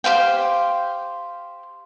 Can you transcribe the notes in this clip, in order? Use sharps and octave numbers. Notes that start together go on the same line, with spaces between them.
G4 C5 F5 G5